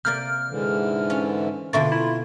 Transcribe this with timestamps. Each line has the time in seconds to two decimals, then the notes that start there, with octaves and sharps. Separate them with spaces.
0.05 C3 A#3 D5 F6 G6
0.49 G#2 D3 E3
1.10 C#4 F4
1.73 B2 D3 A#3 F4 E5 C#6 A6
1.92 E4